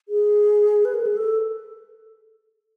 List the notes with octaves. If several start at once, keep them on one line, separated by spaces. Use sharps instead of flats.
G#4
B4
A#4
G#4
A4